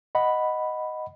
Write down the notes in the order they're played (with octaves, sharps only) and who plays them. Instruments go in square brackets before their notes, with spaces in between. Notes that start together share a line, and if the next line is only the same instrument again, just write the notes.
[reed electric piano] D#5 F#5 B5